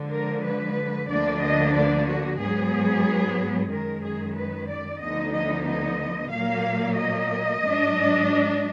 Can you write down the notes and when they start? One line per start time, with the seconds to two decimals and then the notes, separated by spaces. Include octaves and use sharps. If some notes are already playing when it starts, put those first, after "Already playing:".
Already playing: D3 F3 G#3
0.11 A#4
0.44 B4
1.09 D2 D3 F3 A#3 D4 D5
1.41 D#5
1.74 D5
2.07 F#4
2.39 G#2 F#3 B3 G#4
3.70 F#2 D#3 G#3 A#4
4.02 G#4
4.34 B4
4.68 D5
5.00 D2 D3 F3 B3 D#4 D#5
5.33 D#5
5.66 D#5
6.30 A#2 F#3 A#3 F5
6.95 D#5
7.61 G#2 F#3 D4